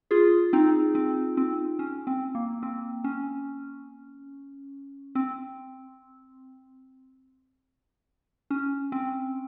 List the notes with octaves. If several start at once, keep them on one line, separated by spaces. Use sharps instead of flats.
F4 G#4
C4 D#4
C4
C4
C#4
C4
A#3
C4
C#4
C4
C#4
C4